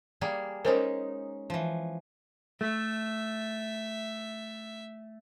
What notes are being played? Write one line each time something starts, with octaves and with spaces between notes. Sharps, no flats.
G3 A#3 G#4
G#3 C#4 D#4 A#4 C5
E3 F3
A3 E5